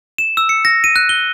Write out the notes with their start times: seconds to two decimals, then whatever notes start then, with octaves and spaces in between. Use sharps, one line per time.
0.18 E7
0.37 E6
0.49 C#7
0.65 A#6
0.84 D#7
0.96 F#6
1.09 G7